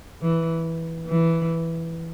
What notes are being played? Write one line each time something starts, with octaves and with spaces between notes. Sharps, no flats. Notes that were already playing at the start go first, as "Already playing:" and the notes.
E3
E3